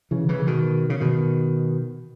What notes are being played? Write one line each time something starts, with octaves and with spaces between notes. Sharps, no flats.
C#3 E3
C#3 E3
B2 D#3
C#3
B2 D#3